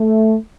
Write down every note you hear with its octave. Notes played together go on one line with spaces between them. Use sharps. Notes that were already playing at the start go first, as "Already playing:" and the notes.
Already playing: A3